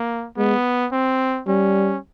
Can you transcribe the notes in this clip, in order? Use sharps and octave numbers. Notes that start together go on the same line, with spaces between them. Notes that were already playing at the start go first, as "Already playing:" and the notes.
Already playing: A#3
G#3 B3
C4
G3 C#4